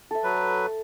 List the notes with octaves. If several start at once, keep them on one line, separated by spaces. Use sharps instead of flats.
A4 E5
F#3 B4